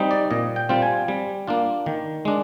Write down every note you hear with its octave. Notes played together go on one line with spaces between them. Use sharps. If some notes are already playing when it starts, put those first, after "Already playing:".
Already playing: G3 C4 D#4
D5
A#2 D#5
G5
G3 C4 F4
G#5
G3
A#3 D4 F4
D#3
G#3 D4